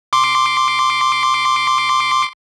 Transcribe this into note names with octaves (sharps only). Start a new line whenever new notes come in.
C6 D6